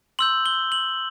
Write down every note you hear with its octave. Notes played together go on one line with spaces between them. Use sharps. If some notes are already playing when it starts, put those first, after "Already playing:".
C6 E6 G6 F#7
G7
F#7